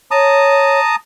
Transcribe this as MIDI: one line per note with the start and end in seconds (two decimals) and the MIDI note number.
0.11 0.80 73
0.11 0.96 81
0.11 0.96 82
0.11 0.96 87